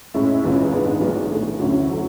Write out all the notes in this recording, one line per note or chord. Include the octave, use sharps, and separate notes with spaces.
A2 G#3 C#4 E4
C#2 C#3 E3 G#3
G#2 G#3 B3 D4
B1 A2 E3 G#3 D4
A2 E3 A3
D2 D3 F#3 C#4 E4
F#3 A3